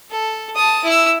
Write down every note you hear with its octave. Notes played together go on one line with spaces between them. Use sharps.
A4
A5 D#6
E4 E6